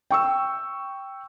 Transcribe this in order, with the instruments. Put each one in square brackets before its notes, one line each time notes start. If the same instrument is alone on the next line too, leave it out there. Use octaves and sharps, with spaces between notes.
[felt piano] G5 C#6 E6